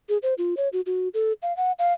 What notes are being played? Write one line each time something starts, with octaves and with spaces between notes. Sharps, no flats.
G#4
C5
F4
C#5
F#4
F#4
A4
F5
F#5
F5